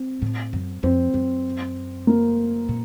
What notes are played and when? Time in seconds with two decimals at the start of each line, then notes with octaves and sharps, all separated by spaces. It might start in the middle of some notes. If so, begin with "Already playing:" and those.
Already playing: C4
0.22 A2
0.53 F#2
0.83 F2 C4
1.14 F#2
2.07 A#3
2.69 A#2